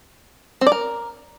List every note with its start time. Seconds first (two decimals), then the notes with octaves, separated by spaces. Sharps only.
0.61 C4
0.66 D5
0.72 A#4